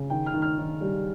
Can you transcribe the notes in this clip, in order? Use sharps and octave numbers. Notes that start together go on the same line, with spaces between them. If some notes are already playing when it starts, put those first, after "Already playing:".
Already playing: C#3
D#3 G5
F6
D#3
F6
D#3
G3